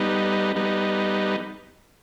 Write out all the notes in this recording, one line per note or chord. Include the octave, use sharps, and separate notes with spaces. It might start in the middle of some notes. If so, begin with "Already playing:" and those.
Already playing: G3 B3 D#4
G3 B3 D#4